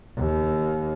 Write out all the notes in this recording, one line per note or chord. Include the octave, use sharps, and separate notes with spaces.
D#2